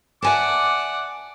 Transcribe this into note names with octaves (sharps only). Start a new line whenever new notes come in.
D5 E5 F#5 G#5 A5 D6